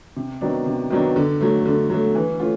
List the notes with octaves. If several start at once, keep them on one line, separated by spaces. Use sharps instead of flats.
C3
D#3 F#3 B3 D4
C3
D#3 F#3 B3 D4
D3
F#3 A3
D3
F#3 A3
E3
A3 C#4 F4